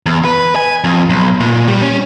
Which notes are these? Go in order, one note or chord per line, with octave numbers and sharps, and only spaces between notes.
E2
B4
G#5
F2
B1
A#2
G3
C#4